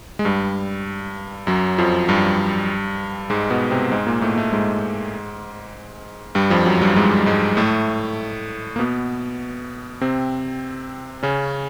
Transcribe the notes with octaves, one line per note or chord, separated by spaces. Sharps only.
G#3
G2 G3
F#2 F#3
F2 F3
G2 G3
G#2 G#3
B2 B3
C3 C4
G#2 G#3
A#2 A#3
A2 A3
A2 A3
G#2 G#3
G2 G3
F2 F3
F#2 F#3
G2 G3
G#2 G#3
G#2 G#3
A2 A3
A#3
B2 B3
C3 C4
C#3 C#4